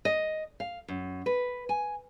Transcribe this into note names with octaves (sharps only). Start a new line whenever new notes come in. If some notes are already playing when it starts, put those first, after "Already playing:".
D#5
F5
F#2
B4
G#5